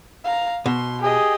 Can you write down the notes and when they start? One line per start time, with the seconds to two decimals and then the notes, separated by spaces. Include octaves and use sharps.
0.24 F5 A#5
0.66 B2 C6
1.02 G4 G#4 D#5